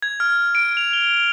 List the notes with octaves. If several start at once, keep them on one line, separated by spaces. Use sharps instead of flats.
G#6
F6
D7
F7
G7